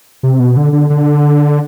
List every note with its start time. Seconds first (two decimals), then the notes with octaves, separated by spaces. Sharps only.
0.23 C3
0.40 B2
0.57 D3
0.73 D3
0.90 D3